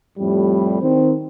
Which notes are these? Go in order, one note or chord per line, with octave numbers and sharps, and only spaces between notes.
F2 A2 G3
D#3 C4